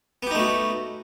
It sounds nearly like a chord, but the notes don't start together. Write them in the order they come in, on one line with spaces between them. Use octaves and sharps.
B3 G4 D#4 A3 F#4